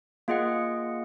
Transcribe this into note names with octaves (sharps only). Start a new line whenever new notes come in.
A#3 F4 G#4 D#5 F#5